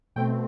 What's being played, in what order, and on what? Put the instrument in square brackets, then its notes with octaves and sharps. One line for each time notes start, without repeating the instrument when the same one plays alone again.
[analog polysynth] B2 A3 C4 G5